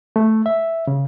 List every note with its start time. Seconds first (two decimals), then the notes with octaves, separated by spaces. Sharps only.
0.16 A3
0.46 E5
0.87 C#3